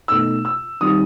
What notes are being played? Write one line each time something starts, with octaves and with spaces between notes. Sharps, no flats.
B2 A3 D#4 E6
E6
D#3 G3 C4 D#4 D#6